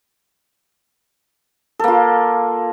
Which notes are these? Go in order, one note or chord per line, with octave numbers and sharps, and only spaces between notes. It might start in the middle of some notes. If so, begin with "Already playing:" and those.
A#3 F4 A4